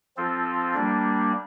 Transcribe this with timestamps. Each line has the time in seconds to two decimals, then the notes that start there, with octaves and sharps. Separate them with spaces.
0.17 F3 C4 F4 A4
0.74 G3 A#3 D4